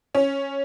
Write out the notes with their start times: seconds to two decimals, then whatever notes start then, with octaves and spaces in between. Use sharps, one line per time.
0.15 C#4